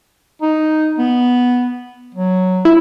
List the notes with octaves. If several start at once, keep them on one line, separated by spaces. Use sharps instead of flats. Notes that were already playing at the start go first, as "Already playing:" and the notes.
D#4
B3
F#3
E4